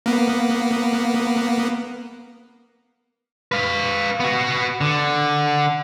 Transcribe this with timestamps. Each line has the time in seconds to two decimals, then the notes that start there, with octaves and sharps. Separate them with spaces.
0.06 A#3 B3
3.52 B4 F5
4.20 B3 F#4
4.81 D3